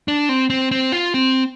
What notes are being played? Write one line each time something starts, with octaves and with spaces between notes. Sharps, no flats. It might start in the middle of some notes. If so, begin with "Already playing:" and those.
D4
C4
C4
C4
F4
C4